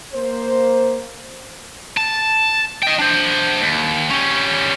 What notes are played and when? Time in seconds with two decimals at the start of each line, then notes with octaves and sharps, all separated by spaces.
0.14 A#3 C5
1.97 A5
2.83 D#5 G5
2.99 D4 C5
3.61 D#2
4.10 G3 C#4